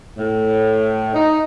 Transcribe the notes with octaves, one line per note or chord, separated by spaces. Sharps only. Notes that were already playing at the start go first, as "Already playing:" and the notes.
A2
D#4